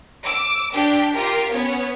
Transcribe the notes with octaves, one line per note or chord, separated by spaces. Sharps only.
D6 E6
D4 G4 G5
F4 G4 A#4
B3 C#4 C#5